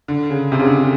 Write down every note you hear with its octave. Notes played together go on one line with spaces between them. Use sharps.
D3
C#3
C3
C#3
D3
D3
C#3